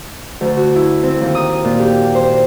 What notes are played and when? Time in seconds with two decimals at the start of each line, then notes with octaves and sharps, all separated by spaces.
0.41 D2
0.57 F#4
0.76 E4
1.03 C4
1.21 D#2
1.35 D#6
1.64 A#2
1.79 G4
2.15 C5